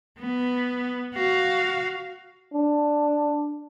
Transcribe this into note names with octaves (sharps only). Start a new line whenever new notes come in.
B3
F#4 F5
D4